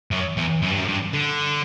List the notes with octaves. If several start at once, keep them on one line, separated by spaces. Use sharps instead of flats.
F#2
E2
F#2
G2
F#2
G2
D3